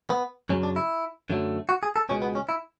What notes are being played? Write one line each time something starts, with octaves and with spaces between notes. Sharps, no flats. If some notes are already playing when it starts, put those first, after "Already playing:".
B3
F#2 C#3 F#3 C#4
D4
E4
F#2 D3 F#3 A3
F#4
G#4
A4
C#2 B2 G#3 C#4
B3
C#4
E4